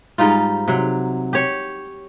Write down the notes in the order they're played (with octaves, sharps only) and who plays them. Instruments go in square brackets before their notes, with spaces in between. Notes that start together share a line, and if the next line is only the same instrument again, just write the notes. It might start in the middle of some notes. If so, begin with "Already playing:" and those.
[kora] G#2 G3 D#4 F4
C3 F#3
G4 C#5